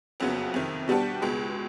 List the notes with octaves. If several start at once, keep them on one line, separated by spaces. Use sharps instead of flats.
F#1 F2 C#3 F#3 B3
F2 C3 D#3
B2 G3 B3 D4 G4
C#2 B2 G#3